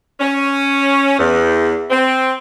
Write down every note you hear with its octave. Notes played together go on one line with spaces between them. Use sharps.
C#4
E2
C4